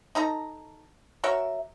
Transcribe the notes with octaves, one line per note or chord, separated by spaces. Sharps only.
D#4 A4 A#5
F#4 A#4 C#5 E5